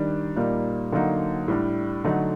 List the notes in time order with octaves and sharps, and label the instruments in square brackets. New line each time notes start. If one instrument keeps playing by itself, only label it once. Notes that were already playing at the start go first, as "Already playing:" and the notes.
Already playing: [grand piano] D#3 G3 D4
A#2 G3 A#3 D#4
D3 F#3 A#3 D#4
A2 G3 D4
D3 F#3 A3 D#4